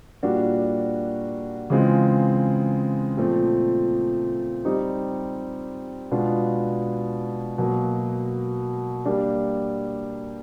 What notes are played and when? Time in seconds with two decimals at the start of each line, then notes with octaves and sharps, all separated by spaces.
0.23 A#2 G3 A#3 D4 F#4
1.70 C#3 E3 G#3 C4 F4
3.17 A#2 F3 A3 C4
4.65 G3 C4 D#4 G4
6.11 B2 G#3 B3 D4 F4
7.58 B2 F#3 A#3
9.05 G3 A#3 D4 G4